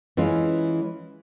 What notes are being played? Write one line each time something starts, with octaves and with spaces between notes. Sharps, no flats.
E3 G#3 C#4 F4